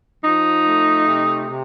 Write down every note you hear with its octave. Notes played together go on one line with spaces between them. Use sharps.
F3 D#4
A3
C3
C3